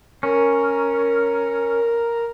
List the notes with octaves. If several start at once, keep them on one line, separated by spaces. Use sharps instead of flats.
C#4 A#4